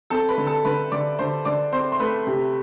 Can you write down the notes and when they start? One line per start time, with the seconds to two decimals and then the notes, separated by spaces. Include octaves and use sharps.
0.10 C4 A4 A5
0.29 B4 B5
0.38 D3
0.47 A4 A5
0.65 D3 B4 B5
0.92 D3 D5 D6
1.19 D3 C5 C6
1.45 D3 D5 D6
1.72 C4 C5 C6
1.92 C6
1.99 A3 B4 B5
2.27 C3